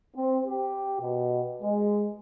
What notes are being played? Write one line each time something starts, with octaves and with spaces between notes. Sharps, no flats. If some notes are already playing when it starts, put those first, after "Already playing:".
C4
G4
B2
G#3